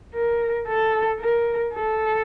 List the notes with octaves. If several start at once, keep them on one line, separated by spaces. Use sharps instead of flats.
A#4
A4
A#4
A4